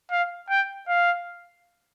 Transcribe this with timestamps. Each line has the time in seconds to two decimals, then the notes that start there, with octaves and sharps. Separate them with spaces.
0.11 F5
0.50 G5
0.88 F5